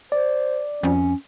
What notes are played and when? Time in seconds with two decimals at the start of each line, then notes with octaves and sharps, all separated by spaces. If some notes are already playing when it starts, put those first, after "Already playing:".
0.12 C5 D5
0.83 F2 C#4